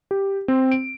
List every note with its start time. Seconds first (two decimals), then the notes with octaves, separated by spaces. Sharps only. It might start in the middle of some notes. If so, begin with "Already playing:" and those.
0.11 G4
0.48 C4
0.71 D7